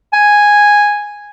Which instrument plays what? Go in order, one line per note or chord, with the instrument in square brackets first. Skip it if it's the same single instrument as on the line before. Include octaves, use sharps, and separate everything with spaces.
[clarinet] G#5